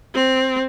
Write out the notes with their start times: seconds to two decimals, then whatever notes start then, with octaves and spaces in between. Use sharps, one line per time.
0.14 C4